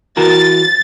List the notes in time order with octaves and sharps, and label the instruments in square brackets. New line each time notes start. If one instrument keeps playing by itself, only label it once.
[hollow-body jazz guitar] E3 F#4 A#4 [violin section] A6